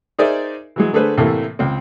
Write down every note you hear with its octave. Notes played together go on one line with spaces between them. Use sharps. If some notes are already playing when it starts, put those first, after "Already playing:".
D#4 G#4 A#4 C5 D5 E5
E3 F#3 G#3
D3 A3 G#4 B4 C5
A2 C3 E3 A3 A#3
C#2 C4